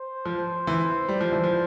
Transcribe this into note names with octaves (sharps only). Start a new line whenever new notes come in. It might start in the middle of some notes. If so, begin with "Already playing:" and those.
Already playing: C5
F3
E3
G3
F3
E3
F3